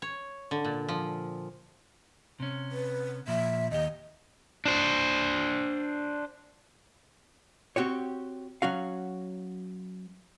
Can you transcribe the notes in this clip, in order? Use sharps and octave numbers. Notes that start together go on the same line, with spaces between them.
C#5
D3
A#2
F3
C3 C#4
B4
A#2 F3 E5
D#2 G4 D#5
D4 C5
C4 F#4 G4 C#5
F#3 C#4 F#4 F5